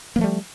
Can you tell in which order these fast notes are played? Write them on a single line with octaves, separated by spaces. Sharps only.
A#3 F3 A3 G3